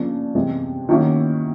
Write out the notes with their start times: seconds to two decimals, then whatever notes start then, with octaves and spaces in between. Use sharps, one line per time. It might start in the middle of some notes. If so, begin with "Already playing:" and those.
Already playing: C#3 F3 A#3 D4
0.35 C3 E3 G#3
0.89 D#3 F#3 A#3 C#4 E4